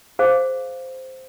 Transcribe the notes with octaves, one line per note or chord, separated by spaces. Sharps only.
G#4 C5 F5